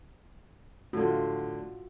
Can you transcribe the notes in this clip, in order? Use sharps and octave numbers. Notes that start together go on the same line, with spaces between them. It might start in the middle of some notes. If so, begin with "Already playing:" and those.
A2 D3 F4 F#4